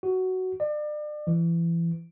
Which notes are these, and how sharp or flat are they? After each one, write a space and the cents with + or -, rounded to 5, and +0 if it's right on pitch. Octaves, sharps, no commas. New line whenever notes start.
F#4 +10
D5 +35
E3 +30